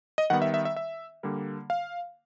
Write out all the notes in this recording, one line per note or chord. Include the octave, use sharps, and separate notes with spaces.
D#5
D#3 G3 B3 F#5
E5
E5
E5
E5
D3 G3 A#3
F5